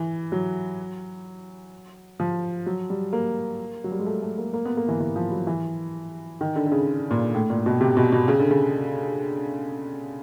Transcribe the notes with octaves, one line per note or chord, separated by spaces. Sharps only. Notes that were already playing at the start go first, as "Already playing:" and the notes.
Already playing: E3
F#3
F3
F#3
G3
A#3
F#3
G3
G#3
A3
A3
A#3
A#3
B3
A#3
E3
E3
F3
F#3
E3
D#3
D3
D3
C#3
A#2
A2
A#2
B2
C3
B2
B2
C#3
D3
C#3